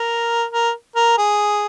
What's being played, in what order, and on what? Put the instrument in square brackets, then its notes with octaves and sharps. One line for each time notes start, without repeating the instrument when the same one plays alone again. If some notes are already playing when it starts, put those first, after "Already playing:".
Already playing: [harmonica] A#4
A#4
A#4
G#4